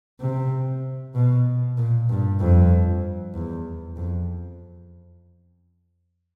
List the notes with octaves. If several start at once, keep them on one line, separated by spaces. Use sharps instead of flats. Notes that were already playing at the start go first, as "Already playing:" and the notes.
C3
B2
A#2
G2
F2
E2
F2